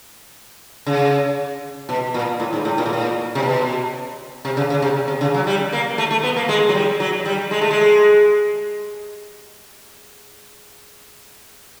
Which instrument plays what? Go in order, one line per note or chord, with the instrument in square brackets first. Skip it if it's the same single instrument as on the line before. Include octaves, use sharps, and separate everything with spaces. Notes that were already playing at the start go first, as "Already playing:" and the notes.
[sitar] C#3
B2
A#2
A2
G#2
A2
A#2
A2
A#2
C3
B2
C3
C#3
C#3
C3
C3
C#3
F#3
G3
A#3
A3
A3
B3
A#3
G#3
F#3
G3
F#3
G3
G#3
A3
G#3